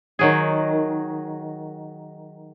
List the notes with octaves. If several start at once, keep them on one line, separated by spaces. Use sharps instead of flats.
D#3 F#3 G#4